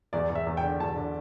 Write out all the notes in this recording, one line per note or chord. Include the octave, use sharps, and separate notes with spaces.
E2 D5
E2
E5
E2
G5
D3
E2 A5
D3